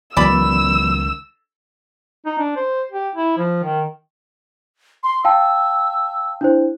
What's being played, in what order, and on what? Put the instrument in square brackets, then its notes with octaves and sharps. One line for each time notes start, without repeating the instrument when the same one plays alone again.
[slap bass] C#2 D#3 [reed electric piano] E3 F#3 B3 [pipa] D5 B5 [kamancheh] E6
[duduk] D#4
D4
C5
G4
E4
F3
D#3
[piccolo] C6
[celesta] F5 G5 A5 [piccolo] E6
[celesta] D4 E4 C5